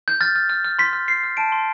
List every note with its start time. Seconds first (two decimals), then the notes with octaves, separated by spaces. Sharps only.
0.08 G6
0.21 F6 A6
0.36 F6
0.50 F6
0.65 F6
0.79 C6 B6
0.93 F6
1.08 F6 C7
1.23 F6
1.37 A5 D7
1.52 C6